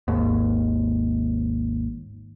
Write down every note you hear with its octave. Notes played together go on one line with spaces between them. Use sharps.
G#1 D#2